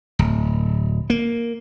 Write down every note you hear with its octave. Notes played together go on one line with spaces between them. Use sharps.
D1
A#3